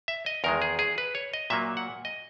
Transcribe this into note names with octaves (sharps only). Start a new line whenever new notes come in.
E5
D#5
E2 D#3 G#3 A#4
G#4
G#4
B4
C#5
D#5
A#2 F#3 A#3 E5
F#5
D#5